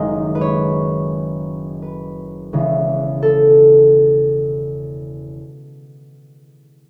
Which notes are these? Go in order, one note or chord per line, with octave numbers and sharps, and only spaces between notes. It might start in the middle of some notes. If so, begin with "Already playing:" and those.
Already playing: F#1 F#2 D#3 G#3 D#5
B4
C#5
B4
E1 E2 C#3 E3
A4